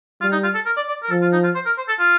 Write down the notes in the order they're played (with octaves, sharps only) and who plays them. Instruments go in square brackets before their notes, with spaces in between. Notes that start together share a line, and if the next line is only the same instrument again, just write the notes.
[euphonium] G3 [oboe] F4
[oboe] D#4
F4
A4
A#4
D5
D5
A#4
[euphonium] F3 [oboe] A4
[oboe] F4
D#4
F4
C5
A#4
C5
A4
F4